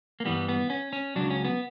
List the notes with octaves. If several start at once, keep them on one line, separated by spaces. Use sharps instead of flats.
A#3
G2 E3 G3 B3
B3
C#4
C#4
C#2 C#3 F#3 D4
C#4
B3